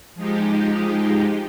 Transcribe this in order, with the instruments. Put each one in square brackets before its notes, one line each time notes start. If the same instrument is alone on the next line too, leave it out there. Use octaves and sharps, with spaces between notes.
[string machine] F3 G#3 D#4 G4